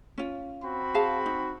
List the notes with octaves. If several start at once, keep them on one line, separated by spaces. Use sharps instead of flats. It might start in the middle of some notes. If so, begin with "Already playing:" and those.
C#4 F4
C4 F#4 B5
G#4 F5 A5
D#4